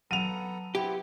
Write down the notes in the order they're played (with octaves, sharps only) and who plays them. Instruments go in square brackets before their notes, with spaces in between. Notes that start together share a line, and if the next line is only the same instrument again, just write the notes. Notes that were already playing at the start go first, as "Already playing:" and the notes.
[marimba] F#3 [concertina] B3 A4 A#5 [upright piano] D#7 F7
[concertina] B3 C4 E4 [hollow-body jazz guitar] G4